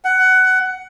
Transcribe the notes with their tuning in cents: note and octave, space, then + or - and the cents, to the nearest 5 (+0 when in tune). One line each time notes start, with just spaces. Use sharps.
F#5 +15